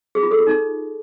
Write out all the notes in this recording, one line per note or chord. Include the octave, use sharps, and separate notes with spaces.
G#4
F4
A4
F4
D#4